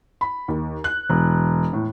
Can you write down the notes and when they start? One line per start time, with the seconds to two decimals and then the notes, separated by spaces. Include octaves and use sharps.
0.21 B5
0.48 D#2
0.84 F#6
1.10 E1
1.73 A2